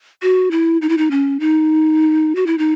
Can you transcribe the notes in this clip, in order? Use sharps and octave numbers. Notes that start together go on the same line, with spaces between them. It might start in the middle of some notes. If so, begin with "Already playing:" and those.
F#4
E4
D#4
E4
D#4
C#4
D#4
F#4
E4
D#4